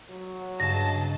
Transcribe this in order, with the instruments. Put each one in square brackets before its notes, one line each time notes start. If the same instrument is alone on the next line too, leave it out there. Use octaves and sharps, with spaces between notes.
[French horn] F#3
[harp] G2 C#3 [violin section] G#4 D#5 A5 [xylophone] A#6